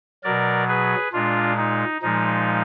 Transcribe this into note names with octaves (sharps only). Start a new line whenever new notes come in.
B2 F#3 A#4 D5
G#4 B4
A#2 G#3 D4 F4
D#4
A#2 F3 G#3 D#4